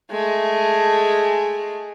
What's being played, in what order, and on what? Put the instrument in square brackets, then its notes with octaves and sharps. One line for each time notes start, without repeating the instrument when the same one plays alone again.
[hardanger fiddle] G#3 A3